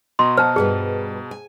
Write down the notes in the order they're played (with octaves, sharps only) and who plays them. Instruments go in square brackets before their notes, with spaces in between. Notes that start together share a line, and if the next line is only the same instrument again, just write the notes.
[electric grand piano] B2 D#5 A#5 [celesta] C6
[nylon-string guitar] F#4 [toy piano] C5 A5 [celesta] F6
[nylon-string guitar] G2 G3 B4 [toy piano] G#4
[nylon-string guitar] G#5